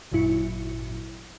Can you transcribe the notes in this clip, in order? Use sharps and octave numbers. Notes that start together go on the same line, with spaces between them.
G#1 F#2 A#2 F#3 E4 C#7